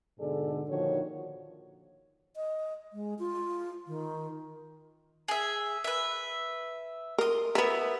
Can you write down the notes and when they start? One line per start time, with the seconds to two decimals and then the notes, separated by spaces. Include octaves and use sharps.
0.19 G#2 B2 D3 G#4 A4 D5
0.69 A#2 D3 D#3 F3 F#4 C#5
2.36 D#5
2.93 G#3
3.19 F4
3.87 D#3
5.28 G#4 E5
5.84 B4 E5
7.18 A#4 C6 D#6
7.55 B3 E4 A#4 B4